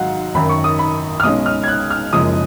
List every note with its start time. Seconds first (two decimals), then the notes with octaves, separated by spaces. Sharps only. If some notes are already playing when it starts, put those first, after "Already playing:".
Already playing: G#1 G#2 F#3 F5 F#5
0.34 G#1 F#2 D#3 B5
0.49 C#6
0.64 D#6
0.79 B5
1.20 F6
1.23 B1 B2 G#3 C#4 D#6
1.46 F6
1.64 G#6
1.68 F#6
1.91 F6
2.13 F#1 F#2 F3 G#3 D#6